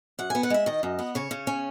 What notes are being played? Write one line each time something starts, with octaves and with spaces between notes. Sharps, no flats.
F#2 F#5
B3 G#5
F#5
G#3 E5
D#3 D#5
F#2
B3
C#3 C#5
C#3
C#4